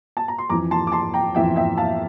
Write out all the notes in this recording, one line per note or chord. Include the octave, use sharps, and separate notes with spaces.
A5
A#5
C6
F2 E3 A#5 D6
A5 C6
D6
A5 C6
G5 A#5
F2 E3 E5 G5
E5 G5
F5 A5